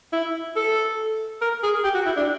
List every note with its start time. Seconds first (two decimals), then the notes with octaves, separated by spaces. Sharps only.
0.13 E4
0.56 A4
1.41 A#4
1.63 G#4
1.84 G4
1.95 F#4
2.06 E4
2.17 D4